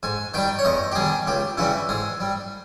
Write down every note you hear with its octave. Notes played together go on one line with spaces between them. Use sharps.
G#2 G#5
D#3 G3 G5
C#5
E2 D#5
G4
D#3 G3 G#4
C#2 G4
C#3 E3 G3 E4
G#2 G#4
G3